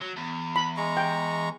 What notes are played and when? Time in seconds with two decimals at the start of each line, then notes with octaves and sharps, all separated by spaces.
0.01 F#3
0.16 E2
0.56 B5
0.77 G#3 A#5 C#6
0.97 G5